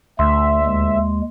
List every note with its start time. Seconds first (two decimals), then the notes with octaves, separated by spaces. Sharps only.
0.19 D2 A3 E5 C6
0.66 D#2 G#3